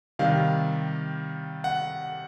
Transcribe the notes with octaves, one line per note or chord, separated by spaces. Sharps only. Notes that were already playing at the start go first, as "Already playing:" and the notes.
C3 D#3 G3 F5
F#5